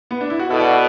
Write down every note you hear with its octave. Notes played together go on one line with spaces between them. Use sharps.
B3
D4
E4
F#4
B2 E4 A4
D5 F#5
B4 E5